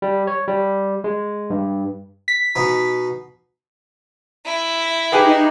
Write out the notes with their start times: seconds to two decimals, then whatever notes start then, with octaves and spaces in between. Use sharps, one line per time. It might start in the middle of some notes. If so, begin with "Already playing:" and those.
0.02 G3
0.27 C#5
0.48 G3
1.04 G#3
1.50 G2
2.28 B6
2.55 B2 B3 D#4
4.46 E4
5.12 D#4 G4 G#4 B4